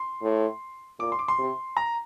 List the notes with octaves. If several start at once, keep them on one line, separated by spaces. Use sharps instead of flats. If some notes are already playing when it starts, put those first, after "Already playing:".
Already playing: C6
A2
A#2 D6
C6
D6
C6
C3
A#5